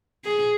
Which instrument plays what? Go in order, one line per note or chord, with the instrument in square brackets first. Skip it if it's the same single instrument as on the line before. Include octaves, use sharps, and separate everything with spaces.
[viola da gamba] G#4